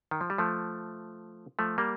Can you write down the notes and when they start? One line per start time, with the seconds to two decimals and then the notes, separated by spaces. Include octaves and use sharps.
0.11 D#3
0.21 F3
0.30 G3
0.38 F3 A3
1.59 F3 A3
1.78 G3 A#3